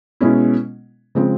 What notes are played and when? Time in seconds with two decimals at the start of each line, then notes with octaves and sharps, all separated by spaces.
0.21 B2 G#3 C#4 E4
1.15 C#3 F3 G#3 C4